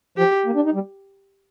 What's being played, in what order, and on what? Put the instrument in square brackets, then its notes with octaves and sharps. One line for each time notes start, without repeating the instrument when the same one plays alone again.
[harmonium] F3 [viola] G4
[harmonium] A#3
D4
D#4
G3